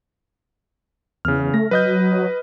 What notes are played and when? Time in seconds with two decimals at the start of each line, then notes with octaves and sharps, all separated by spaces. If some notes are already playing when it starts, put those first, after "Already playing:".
1.25 E2 C#3 F6
1.54 A3 A#6
1.71 F#3 B4 D#5 G6